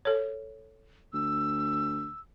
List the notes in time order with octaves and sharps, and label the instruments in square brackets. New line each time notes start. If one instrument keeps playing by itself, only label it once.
[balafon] A4 C#5
[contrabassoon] D2 [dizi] E6